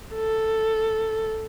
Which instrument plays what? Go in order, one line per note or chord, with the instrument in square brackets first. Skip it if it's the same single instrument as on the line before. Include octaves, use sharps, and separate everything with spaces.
[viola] A4